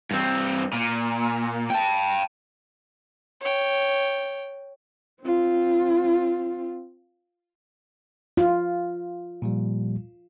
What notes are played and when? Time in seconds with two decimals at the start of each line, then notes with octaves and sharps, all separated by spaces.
0.11 G2 C4
0.73 A#2
1.70 G5 A5
3.41 C#5 G5
5.22 C4 F4
8.37 F4
9.42 A#2 F3 G3